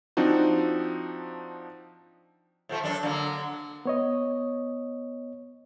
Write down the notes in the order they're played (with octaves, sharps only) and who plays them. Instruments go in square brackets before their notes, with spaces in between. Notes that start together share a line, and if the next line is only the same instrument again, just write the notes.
[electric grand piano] F3 C4 D4 D#4 F#4
[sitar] A2 F3 A3
F#2 D4 A4
D3 F#3 A#3
[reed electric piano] B3 C#5 D#5